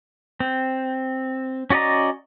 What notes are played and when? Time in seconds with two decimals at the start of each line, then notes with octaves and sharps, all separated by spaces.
0.40 C4
1.70 C#4 F#4 D5 D#5 A#5